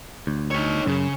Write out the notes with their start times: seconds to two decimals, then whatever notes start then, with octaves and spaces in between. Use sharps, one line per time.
0.27 D2
0.51 D#4 C#5
0.86 F#2 C#3